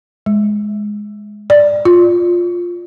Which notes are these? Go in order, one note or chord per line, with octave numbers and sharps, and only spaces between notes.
G#3
D5
F4